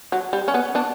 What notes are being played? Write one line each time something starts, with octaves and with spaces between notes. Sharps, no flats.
F#3
G3
C#4
B3
B3 D4